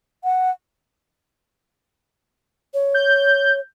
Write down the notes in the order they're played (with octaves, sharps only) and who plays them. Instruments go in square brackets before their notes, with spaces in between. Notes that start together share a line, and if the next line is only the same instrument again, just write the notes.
[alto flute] F#5
[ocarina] C#5
[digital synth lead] G6